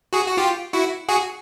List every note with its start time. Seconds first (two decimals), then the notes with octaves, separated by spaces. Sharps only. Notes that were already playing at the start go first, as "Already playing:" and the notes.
0.13 F#4 G#4
0.27 F#4
0.37 F4 G4
0.73 E4 F#4
1.09 F#4 G#4